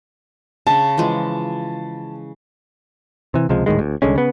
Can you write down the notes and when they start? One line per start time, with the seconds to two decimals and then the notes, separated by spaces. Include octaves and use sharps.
0.67 C#3 A5
0.98 E3 F3 G#3
3.34 C3 E3
3.49 C#2 C3 F3 G#3
3.66 D#1 A2 D#3 G#3
3.79 D2
4.02 C2 D3 G#3 C#4
4.16 C#3 B3